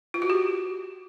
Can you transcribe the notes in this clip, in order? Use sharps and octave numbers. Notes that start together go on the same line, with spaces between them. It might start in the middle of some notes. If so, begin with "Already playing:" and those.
F4
F#4
G4